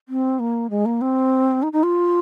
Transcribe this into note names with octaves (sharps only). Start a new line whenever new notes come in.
C4
A#3
G#3
A#3
C4
D#4
D#4
F4